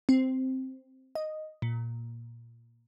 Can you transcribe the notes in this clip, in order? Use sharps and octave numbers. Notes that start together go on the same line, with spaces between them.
C4
D#5
A#2